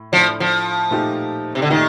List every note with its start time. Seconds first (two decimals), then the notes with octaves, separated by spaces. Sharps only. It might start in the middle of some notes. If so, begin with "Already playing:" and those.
Already playing: A2
0.12 A2 F3 A3 D4
0.40 F3
0.91 A#2 A3 D#4 G4
1.55 C3
1.62 D3
1.70 A#2 D#3 A3 D#4 G4